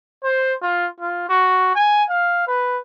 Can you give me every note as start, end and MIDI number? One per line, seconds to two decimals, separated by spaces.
0.23 0.54 72
0.62 0.87 65
1.00 1.28 65
1.29 1.75 66
1.75 2.04 80
2.09 2.45 77
2.47 2.78 71